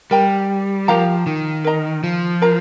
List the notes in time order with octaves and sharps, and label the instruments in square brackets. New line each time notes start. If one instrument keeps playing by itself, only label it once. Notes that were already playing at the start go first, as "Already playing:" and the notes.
[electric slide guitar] G3 [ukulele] A#4 G5 A#5
[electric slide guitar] F3 [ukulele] G4 A#4 F5 A#5
[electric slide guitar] D#3
[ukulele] A#4 D#5 A#5
[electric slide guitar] F3
[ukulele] A#4 F5 A#5